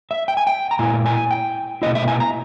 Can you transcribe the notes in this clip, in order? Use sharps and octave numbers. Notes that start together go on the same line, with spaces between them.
E5
G5
G#5
G5
A#5
A#2 A#3 E4 G#5
G#5
G5
B2 A#3 E4 D#5
E5
G#5
A#5